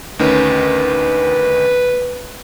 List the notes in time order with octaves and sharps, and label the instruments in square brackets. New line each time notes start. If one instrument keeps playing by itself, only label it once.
[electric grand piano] D2 D#3 C#4 [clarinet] B4